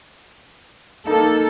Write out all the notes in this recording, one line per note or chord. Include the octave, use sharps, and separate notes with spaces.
A#3 D#4 A4